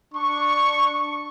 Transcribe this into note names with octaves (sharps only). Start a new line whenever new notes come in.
D4 C#6